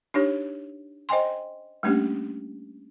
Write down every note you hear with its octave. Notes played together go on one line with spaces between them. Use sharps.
D4 D#4 G4 C#5
C5 D#5 G5 G#5 C6
G3 A3 A#3 C#4 D4 G4